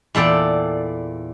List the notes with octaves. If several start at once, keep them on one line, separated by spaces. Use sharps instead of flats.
E2 A#2 A4 D5 G5